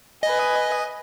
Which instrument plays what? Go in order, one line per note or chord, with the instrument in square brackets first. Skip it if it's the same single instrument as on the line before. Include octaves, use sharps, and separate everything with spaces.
[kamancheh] B4 G#5 [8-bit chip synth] D#5